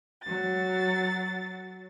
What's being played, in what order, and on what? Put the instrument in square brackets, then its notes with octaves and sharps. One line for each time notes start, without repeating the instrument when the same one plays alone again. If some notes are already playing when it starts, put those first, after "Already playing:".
[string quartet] F#3 A6